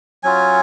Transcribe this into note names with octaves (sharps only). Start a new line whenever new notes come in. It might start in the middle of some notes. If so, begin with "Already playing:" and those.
F#3 C#4 F4 G#5